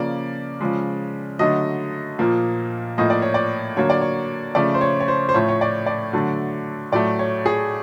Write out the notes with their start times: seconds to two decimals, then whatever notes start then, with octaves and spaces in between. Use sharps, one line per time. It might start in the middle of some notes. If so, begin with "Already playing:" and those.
Already playing: C#3 F3 A#3 D5
0.61 C#3 F3 G#3
1.39 D3 F#3 A3 D#5
2.19 A#2 F3 A#3
2.98 A2 F3 A#3 D#5
3.10 D5
3.22 C#5
3.34 D5
3.77 D3 F#3 A#3 C#5
3.90 D5
4.01 C#5
4.55 C#3 F3 A3 D5
4.74 C5
4.81 C#5
5.00 C#5
5.08 C5
5.29 C5
5.34 A2 F3 A3 C#5
5.49 C#5
5.61 D5
5.86 D5
6.13 D3 F#3 A3
6.92 A2 F#3 A3 D5
7.19 C#5
7.46 G#4